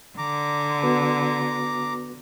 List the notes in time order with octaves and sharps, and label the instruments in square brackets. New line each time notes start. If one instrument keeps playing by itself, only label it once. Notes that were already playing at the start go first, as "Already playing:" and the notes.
[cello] D3 [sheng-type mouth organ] A#5 D6
[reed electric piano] B3 F#4 B4